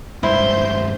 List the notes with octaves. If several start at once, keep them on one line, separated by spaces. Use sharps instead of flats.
C#2 G2 E4 C5 G6